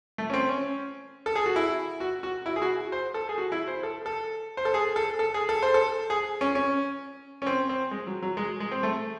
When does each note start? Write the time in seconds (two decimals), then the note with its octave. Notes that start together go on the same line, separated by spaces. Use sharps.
0.18 A3
0.30 C#4
0.33 C4
0.49 C#4
1.26 A4
1.36 G#4
1.46 F#4
1.56 E4
2.00 F#4
2.23 F#4
2.46 E4
2.56 G#4
2.62 F#4
2.92 C5
3.14 A4
3.29 G#4
3.38 F#4
3.52 E4
3.68 C5
3.83 A4
4.06 A4
4.57 C5
4.65 A4
4.74 G#4
4.96 A4
5.19 A4
5.34 G#4
5.49 A4
5.63 C5
5.74 A4
6.10 G#4
6.41 C#4
6.55 C#4
7.42 C#4
7.46 C4
7.69 C4
7.91 G#3
8.07 F#3
8.22 F#3
8.37 G#3
8.60 G#3
8.71 C4
8.83 A3